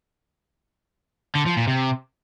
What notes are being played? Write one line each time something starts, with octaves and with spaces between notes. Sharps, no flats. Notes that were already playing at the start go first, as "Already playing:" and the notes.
D3
F3
A#2
C3